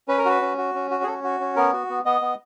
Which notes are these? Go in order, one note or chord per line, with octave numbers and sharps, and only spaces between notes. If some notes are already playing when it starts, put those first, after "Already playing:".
C#4 B4
A#4
F#4 B4
C#4
F#4
C#4
F#4
G#4
C#4 A4
F#4
C#4
B3 A#4
F#4
B3
B3 D#5
B3